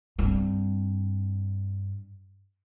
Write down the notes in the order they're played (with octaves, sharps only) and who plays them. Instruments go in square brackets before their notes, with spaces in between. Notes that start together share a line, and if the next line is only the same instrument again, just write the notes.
[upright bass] G2 C4